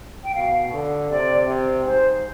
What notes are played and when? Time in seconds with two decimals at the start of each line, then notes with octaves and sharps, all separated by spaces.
0.24 G5
0.35 B2 F5
0.73 D3
1.10 C3 D5
1.47 C3
1.85 G#2 C5